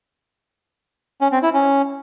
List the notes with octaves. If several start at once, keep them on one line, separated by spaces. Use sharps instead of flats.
C#4
C4
E4
C#4